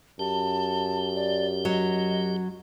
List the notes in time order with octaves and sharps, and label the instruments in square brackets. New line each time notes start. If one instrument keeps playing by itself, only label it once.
[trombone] F#2 [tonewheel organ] G4 [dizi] A5
[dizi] D5
[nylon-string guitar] F#3 [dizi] D#5